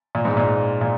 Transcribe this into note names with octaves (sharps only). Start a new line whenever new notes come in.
A#2
G#2
A#2
A#2